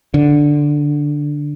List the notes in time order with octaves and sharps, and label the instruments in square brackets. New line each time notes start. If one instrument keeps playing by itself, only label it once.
[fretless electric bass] D3